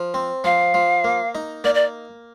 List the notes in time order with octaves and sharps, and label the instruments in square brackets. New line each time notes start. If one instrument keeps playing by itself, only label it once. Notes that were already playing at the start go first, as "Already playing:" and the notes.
Already playing: [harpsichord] F3
C4
[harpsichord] F3 [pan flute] F5
[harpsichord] F3
A#3
D#4
[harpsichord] A#3 [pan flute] D5
[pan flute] D5